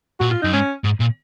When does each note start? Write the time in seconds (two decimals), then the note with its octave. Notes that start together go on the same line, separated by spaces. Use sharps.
0.20 A#2 F#4
0.31 F4
0.42 F#2 D#4
0.53 G#2 C#4
0.84 G#2
1.00 A#2